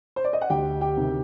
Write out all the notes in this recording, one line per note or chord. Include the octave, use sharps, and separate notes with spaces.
C5
D5
D#5
F#5
D2 G4 G5
G4 G5
C3 D#3